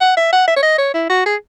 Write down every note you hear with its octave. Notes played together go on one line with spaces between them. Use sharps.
F#5
E5
F#5
E5
C#5
D#5
C#5
E4
F#4
G#4